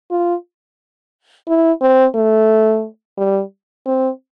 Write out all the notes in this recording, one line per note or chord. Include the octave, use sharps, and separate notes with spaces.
F4
E4
C4
A3
G3
C4